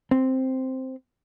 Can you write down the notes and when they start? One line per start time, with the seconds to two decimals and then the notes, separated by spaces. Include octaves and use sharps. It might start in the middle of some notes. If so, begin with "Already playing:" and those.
0.11 C4